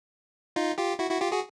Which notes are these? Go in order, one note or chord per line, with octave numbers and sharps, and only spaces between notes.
D#4 F4
F4 G4
E4 F#4
E4 F#4
F4 G4
F#4 G#4